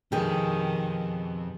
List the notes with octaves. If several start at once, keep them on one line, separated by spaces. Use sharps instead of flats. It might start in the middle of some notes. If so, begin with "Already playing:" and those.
C2 F2 B2 D#3 G4 G#4